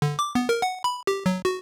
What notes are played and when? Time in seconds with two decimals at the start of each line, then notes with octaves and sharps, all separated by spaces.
0.02 D3
0.19 D6
0.35 B3
0.49 A#4
0.62 F#5
0.84 B5
1.07 G4
1.26 F#3
1.45 F#4